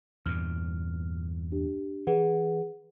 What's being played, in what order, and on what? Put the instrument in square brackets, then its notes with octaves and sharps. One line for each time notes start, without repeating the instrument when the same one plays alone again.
[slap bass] E2 G2 A#2 [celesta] F6
[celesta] D4 G4
[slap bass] E3 [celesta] G#4 B4 F#5